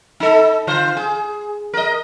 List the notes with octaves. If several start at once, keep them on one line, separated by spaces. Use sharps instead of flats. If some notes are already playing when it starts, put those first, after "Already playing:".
D#4 A4
D3 F4 C5
G#4
A#4 D#5